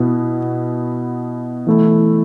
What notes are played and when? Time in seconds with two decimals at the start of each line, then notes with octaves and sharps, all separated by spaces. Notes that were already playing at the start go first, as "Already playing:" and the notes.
Already playing: B2 B3 E4
1.67 E3 A3 E4